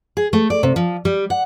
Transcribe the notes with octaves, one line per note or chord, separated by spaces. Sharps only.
G#4
A3
D5
C3
F3
G3
F#5